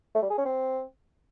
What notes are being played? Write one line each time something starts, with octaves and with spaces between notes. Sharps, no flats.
A3
G3
G#4
C#4
C4